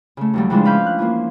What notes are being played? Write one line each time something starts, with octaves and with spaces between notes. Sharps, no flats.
C#3 A3
D#2 F#3 G3
C#3 E3 F3 G#3 B3 D4
C#4 B4 F5 B5 D6 G6
F#6
E3 F3 A#3